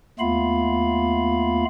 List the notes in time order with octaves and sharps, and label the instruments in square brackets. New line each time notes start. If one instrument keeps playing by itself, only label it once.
[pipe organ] D#2 A3 B3 F4 F5 B5